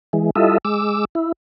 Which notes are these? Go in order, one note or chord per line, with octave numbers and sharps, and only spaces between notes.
E3 G#3
G3 E4 F4 A4 D#5 E5
G#3 D6 E6
E4